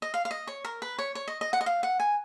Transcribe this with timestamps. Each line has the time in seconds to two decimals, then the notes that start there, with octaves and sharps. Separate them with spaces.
0.02 D#5
0.14 F5
0.25 F5
0.31 D#5
0.47 C#5
0.65 A#4
0.82 B4
0.99 C#5
1.15 C#5
1.28 D#5
1.41 D#5
1.53 F#5
1.61 D#5
1.66 F5
1.83 F#5
2.00 G#5